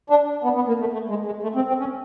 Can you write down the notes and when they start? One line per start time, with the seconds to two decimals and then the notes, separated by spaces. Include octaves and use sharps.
0.10 D4
0.44 B3
0.55 B3
0.68 A#3
0.80 A3
0.93 A3
1.09 G#3
1.26 G#3
1.43 A3
1.55 C4
1.68 C4
1.80 C#4